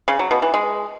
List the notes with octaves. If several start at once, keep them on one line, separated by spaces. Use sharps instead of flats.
C#3
F#3
B2
E3
G#3